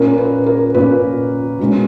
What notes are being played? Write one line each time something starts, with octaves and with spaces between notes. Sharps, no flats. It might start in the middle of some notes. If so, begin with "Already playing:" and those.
Already playing: A#2 A#3 C#4 A#4
B4
A#4
A#2 A#3 C#4 B4
B2 G#3 C#4